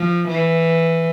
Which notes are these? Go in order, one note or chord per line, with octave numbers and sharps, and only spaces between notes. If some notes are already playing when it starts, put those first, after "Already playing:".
Already playing: F3
E3